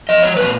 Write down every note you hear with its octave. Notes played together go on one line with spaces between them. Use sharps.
F3 D#5
C#5
A#2 B4